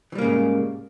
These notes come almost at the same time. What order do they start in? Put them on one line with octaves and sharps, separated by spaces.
E3 G3 A#3 C#3 G#2